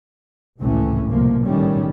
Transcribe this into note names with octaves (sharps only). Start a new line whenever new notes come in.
G#1 C#2 A2 C3 E3 C#4
C2 B2 F3 A#3
B1 A2 D#3 G3 C#4